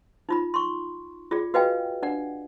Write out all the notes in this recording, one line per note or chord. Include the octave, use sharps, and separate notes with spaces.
D#4 F4 B5
C6 C#6
F4 G#4 D5
F#4 B4 D#5 F5 G5 G#5
D4 D5 F#5